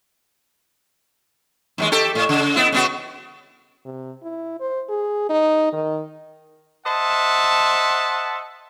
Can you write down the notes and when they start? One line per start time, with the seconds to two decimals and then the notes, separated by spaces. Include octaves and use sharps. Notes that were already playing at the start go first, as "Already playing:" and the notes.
1.78 D#2 G3 G#3
1.92 G4 A4
2.15 A2
2.29 C#3
2.56 B3 E4
2.72 C#3 B3 F#4
3.85 C3
4.23 E4
4.60 C5
4.89 G#4
5.30 D#4
5.73 D#3
6.86 C5 D#5 E5 F#5 A5